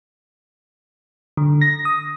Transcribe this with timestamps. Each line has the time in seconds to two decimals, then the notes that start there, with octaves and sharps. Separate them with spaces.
1.37 D3
1.61 A#6
1.85 D#6